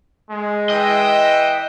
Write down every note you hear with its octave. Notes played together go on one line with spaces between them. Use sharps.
G#3
E3 D#5 E5 G5